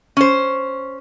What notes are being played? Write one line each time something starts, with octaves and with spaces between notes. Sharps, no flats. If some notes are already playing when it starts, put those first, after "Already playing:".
C#4 C5